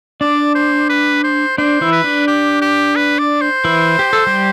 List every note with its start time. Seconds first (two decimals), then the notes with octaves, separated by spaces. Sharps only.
0.21 D4 D5
0.55 C5
0.90 B4
1.24 C5
1.58 D4 C5
1.81 E3 E4
1.92 B4
2.04 D4
2.28 G4
2.62 G4
2.96 B4
3.19 D5
3.41 C5
3.64 E3 E4
3.99 G4
4.13 A4
4.27 G3 G4